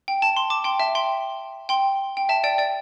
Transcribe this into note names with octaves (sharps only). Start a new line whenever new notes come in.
G5
A5
C6
A5 D6
G5 C6
E5 A5
G5 C6
G5 C6
G5
E5 A5
D5 G5
D5 G5